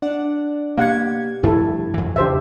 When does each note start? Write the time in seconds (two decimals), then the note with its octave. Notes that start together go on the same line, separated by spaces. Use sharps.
0.02 D4 D5 F#5
0.78 B2 A#3 G4 F5 F#5 G#6
1.43 G2 F3 A3 E4 A4
1.94 F2 E3
2.16 E2 C#3 D4 G4 C5 E5